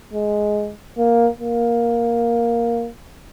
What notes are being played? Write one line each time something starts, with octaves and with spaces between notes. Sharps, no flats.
G#3
A#3
A#3